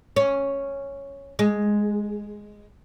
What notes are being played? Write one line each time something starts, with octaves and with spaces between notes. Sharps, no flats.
C#4
G#3